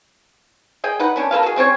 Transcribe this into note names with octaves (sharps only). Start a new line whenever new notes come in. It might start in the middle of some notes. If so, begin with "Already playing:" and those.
G#4 D#5 G5
D#4 B4 F#5
B3 C#4 D4 G4
A#3 A4 B4 F5
F#4 G#4
G3 C4 C#4 C#5